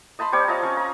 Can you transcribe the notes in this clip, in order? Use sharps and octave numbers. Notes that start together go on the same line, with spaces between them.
D#5 A5 B5 C6
G3 C4 C#5 D5
F4 D#5 A5 A#5
C#4 F4 C#6
A#5